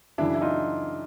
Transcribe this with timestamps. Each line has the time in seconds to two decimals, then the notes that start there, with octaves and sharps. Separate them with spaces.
0.18 F#2 C#3 E3 D4 E4
0.35 E4
0.41 D#4 F4